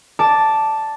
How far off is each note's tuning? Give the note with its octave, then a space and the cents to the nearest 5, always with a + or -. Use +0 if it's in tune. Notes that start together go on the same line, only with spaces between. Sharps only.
D5 +0 A5 +0